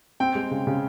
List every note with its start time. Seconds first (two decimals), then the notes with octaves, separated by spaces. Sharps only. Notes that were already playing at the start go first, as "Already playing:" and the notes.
0.20 C4 G5
0.35 G#3
0.51 C#3
0.67 C#3